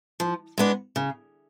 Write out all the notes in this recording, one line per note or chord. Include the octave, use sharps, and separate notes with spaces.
F3
G#3 B3 D4
C#3